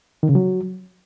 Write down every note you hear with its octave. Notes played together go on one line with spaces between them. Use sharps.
D#3
C#3
F#3